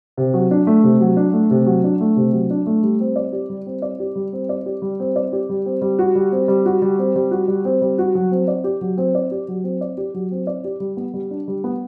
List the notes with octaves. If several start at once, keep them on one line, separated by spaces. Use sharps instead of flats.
C3
F#3
D4
A3
C3
F#3
D4
A3
C3
F#3
D4
A3
C3
F#3
D4
A3
G3
C4
D5
G4
G3
C4
D5
G4
G3
C4
D5
G4
G3
C4
D5
G4
G3
C4
G3
F#4
G3
C4
G3
F#4
G3
C4
G3
F#4
G3
C4
G3
F#4
F#3
C4
D5
G4
F#3
C4
D5
G4
F#3
C4
D5
G4
F#3
C4
D5
G4
G3
B3
G3
D4
G3
B3